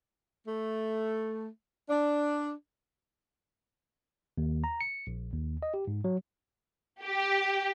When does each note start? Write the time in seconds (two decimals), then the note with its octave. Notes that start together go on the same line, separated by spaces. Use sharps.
0.46 A3
1.90 D4
4.38 D#2
4.64 A#5
4.81 C#7
5.07 A#1
5.33 D#2
5.63 D#5
5.74 G4
5.87 G#2
6.04 F#3
7.02 G4